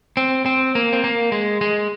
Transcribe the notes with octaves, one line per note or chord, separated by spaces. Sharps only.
C4
C4
A#3
C4
A#3
G#3
G#3